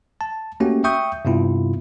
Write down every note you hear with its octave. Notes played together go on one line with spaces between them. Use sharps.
A5
A3 A#3 C#4 F#4 G4
E5 G5 C#6 D#6 G6
G2 C3 B3 E4 F4